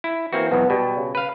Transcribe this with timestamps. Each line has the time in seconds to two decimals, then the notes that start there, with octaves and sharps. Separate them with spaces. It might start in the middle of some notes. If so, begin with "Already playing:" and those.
0.04 E4
0.33 E3 A#3 C4 F#4
0.51 B1 E2 B3
0.70 B2 G3
0.97 C#3
1.15 B4 F5